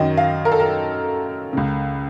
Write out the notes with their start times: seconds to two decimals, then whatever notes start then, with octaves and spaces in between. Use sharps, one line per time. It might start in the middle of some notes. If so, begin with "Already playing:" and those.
Already playing: F#2 D#3 D#5
0.17 F5
0.45 A#4
0.52 A4
0.60 A#4
1.53 C#2 C#3